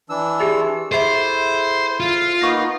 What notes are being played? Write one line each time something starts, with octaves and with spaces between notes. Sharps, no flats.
E3 D4 E6
G4 G#4 E5
E4 G#4 A4 C5 E5 C6
F4
A#3 B3 D#4 C#6 A#6